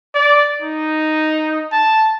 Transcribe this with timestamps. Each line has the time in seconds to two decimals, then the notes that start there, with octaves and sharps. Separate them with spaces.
0.15 D5
0.62 D#4
1.72 A5